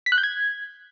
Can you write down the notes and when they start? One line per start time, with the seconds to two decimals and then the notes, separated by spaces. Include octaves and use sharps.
0.06 B6
0.12 F#6
0.18 G6
0.23 G#6